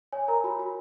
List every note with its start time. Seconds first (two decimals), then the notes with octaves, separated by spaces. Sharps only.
0.12 C#5 G#5
0.28 A#4 A#5
0.44 F#4 B5
0.59 F#4 B5